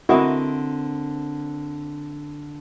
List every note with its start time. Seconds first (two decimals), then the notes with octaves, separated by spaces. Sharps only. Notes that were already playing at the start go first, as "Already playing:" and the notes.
0.09 D3 C4 E4 F#4 A#4 D#5